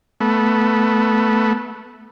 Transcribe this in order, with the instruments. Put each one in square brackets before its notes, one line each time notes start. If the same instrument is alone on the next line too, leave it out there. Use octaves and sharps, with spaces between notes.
[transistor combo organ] A3 B3